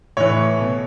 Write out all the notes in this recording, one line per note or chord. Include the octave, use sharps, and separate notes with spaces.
A2 E3 C#5
B2